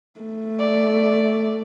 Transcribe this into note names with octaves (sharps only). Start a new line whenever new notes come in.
A3
D5